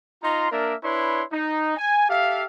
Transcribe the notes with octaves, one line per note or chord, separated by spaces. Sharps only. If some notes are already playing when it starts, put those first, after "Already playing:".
D#4 F4 A#5 C6
A#3 D4 A#4 D5 E5
D4 E4 B4 C#5 C6
D#4
G#5
G4 A4 E5 F5